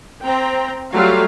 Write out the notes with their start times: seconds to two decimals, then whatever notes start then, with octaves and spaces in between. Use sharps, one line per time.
0.24 C4 G5 A#5
0.93 F#3 G3 A3 F4 F5